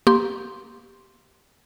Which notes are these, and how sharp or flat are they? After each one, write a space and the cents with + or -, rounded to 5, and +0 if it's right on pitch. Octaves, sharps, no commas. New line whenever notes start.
A#3 +15 G4 +0 C6 +0